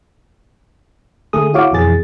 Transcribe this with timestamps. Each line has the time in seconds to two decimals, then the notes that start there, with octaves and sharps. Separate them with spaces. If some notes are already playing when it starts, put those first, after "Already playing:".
1.33 D3 A3 G#4 D#6
1.54 E4 F#4 C#5 F5 D6
1.72 F2 B2 E3 G#4 A6